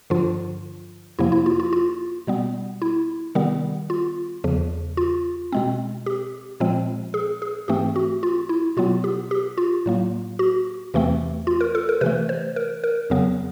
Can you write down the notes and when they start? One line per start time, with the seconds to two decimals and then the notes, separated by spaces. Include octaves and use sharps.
0.10 G2 D3 F3 F4
1.19 F2 C3 F3 A#3 E4
1.32 E4
1.46 F4
1.60 F4
1.73 F4
2.27 B2 G3 B3
2.82 E4
3.35 C3 D#3 G3 B3
3.90 F4
4.44 E2 C#3 F3
4.97 F4
5.52 B2 G#3 C4
6.06 G4
6.60 A#2 F3 G#3 C4
7.14 G#4
7.42 G#4
7.68 G#2 E3 A3 C4 G4
7.96 F#4
8.23 F4
8.49 E4
8.77 B2 F#3 B3 F4
9.04 G4
9.31 G4
9.58 F4
9.86 A2 F#3 A#3
10.39 F#4
10.94 E2 C3 E3 A3 C4
11.47 F4
11.61 A#4
11.75 A4
11.89 A#4
12.01 C3 E3 A3 B4
12.29 C5
12.56 A#4
12.84 A#4
13.10 F2 C#3 F#3 B3